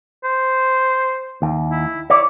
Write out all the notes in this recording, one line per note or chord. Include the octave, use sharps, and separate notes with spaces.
C5
D#2
E4
E4 C#5 D5